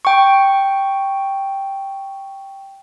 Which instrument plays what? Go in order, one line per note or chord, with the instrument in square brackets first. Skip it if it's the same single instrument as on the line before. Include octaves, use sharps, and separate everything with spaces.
[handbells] G5 C#6